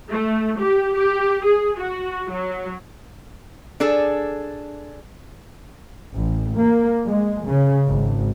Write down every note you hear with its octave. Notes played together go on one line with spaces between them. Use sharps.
A3
G4
G4
G#4
F#4
F#3
D4 G#4 A4
A1
A#3
G#3
C#3
G#1